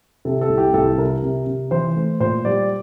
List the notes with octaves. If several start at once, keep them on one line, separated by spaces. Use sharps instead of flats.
C3 A4
A4
C2
G4
C2 A4
C3 A#4
C3
C3
E3 C5
A3
A#2 C5
G3 D5